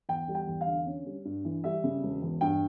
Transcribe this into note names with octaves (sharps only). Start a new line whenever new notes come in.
E2 G5
G3
G5
E2
F5
D3
C#4
G3
G2
E3
G3 E5
C#3
E1
E2
G2 G5